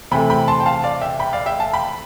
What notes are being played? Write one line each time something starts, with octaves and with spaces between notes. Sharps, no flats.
C3 E3 A3 G5 B5
G5 B5
A5 C6
G5
F5 A5
D5 F5
E5 G5
G5 B5
D5 F5
E5 G5
F5 A5
G5 B5